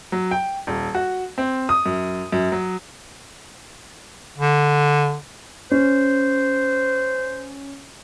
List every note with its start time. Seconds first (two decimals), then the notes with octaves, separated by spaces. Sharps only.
0.12 F#3
0.31 G5
0.67 D#1
0.95 F#4
1.38 C4
1.69 D#6
1.86 F#2
2.32 F#2
2.52 F#3
4.38 D3
5.71 C#4 C5